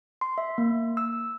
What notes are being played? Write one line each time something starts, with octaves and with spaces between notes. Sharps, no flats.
C6
E5
A#3
E6